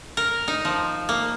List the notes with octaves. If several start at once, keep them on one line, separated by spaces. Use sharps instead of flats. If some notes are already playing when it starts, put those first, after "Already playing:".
A#4
D#4
F3
A#3